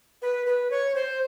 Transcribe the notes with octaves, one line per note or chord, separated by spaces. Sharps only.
B4
B4
C#5
C5